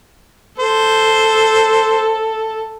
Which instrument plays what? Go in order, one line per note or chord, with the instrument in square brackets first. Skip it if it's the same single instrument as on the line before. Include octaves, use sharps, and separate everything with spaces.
[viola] A4 [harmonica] C5